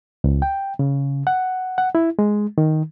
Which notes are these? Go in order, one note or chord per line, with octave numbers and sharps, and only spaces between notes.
C#2
G5
C#3
F#5
F#5
E4
G#3
D#3